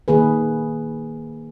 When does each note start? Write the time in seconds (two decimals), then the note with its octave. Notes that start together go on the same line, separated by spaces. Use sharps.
0.08 D#3 A#3 G#4 B4